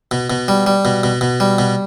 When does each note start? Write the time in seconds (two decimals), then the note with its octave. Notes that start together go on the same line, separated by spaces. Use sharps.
0.11 B2
0.30 B2
0.48 G3
0.67 G3
0.85 B2
1.03 B2
1.21 B2
1.40 G3
1.58 B2